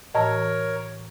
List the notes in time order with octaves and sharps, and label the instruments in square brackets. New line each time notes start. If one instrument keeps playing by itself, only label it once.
[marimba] A2 E3 [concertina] A#4 C#5 [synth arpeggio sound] D#5 A5 A#5